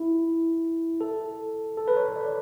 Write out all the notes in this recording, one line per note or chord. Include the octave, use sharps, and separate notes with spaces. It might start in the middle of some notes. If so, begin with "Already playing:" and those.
Already playing: E4
A4
A4
B4
C#5
D5